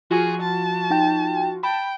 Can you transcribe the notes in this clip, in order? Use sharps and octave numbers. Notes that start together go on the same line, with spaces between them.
F3 F4 F#4 G#4
A5
D#4 G5
G5 A5 B5